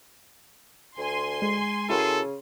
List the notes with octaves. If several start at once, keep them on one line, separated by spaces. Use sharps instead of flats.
D2 G#5 C6
G#3
C#3 E4 F#4 A4 A#4